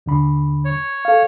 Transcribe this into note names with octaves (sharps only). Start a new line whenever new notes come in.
D#2 D3 B5
C#5
A4 F5